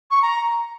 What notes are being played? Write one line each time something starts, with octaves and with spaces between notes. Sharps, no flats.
C#6
A#5